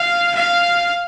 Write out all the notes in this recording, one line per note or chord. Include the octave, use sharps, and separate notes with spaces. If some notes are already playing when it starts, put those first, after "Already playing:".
Already playing: F5
F5